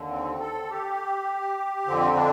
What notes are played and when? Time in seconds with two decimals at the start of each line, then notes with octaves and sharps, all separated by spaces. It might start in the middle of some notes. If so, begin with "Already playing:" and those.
Already playing: D#2 D3
0.11 C4
0.40 A4
0.70 G4
1.86 F2 D3 C4
2.16 D4